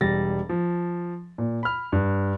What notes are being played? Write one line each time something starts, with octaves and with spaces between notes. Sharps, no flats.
E1 G3 A6 A#6
F3
A#2
B5 F6
G2